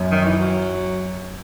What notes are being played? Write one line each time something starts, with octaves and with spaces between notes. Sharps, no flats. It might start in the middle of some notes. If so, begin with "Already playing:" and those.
Already playing: F#2
D#3
E3
F#3